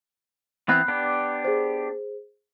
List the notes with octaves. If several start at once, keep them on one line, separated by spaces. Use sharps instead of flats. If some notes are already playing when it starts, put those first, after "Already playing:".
E3 B3 C4 B5 F#6 C7
B3 D4 G4
G#4 C5